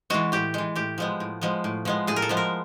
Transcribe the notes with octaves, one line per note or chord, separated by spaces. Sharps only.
E3 G#3 F#4
A2 G4
E3 G#3
A2 G4
F3 G#3 B3
A2
F3 G#3 B3
A2
F3 G#3 B3
A2 G#4
A#4
A4
F3 G#3 B3
A#4